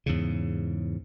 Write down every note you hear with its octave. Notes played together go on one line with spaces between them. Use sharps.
E2 G#2 C#3